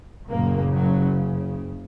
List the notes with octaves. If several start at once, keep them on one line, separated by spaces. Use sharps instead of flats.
F#1 F#2 A#2 C#3 A#3
F#2 F#3